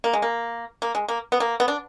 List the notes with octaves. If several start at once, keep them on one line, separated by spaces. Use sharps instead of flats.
A#3
G#3
A#3
A#3
G#3
A#3
B3
A#3
B3
D4